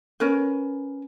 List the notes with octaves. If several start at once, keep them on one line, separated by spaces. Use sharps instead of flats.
C#4 A#4 B4